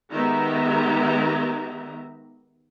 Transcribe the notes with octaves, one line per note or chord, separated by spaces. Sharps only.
D#3 G#3 B3 G4 E5 A#5